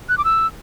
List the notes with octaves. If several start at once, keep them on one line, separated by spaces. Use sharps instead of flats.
F#6
D6
E6